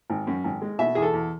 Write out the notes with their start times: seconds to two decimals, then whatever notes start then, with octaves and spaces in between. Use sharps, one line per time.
0.10 G#1
0.27 F#2
0.44 G#1
0.62 G#3
0.79 B2 E5
0.95 E2 G#4
1.02 A4
1.13 E2